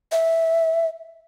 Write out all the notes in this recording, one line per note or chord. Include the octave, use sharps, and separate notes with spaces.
E5